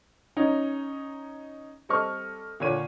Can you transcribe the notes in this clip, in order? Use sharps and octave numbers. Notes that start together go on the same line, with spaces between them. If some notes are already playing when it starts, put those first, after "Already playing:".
C#4 D#4
G3 C4 A4 D#5 C#6 F6
A#2 D3 C#5 D#7